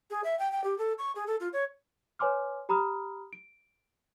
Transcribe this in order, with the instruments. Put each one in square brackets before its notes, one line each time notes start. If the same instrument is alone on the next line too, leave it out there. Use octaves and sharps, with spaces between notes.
[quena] G#4
E5
G5
G5
G4
A4
C#6
G#4
A4
F4
C#5
[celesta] B4 C#5 G#5 C6 D6 F6
G4 A#5 B5 D#6 F6
D7